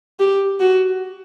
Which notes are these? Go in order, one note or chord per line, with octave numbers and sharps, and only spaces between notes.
G4
F#4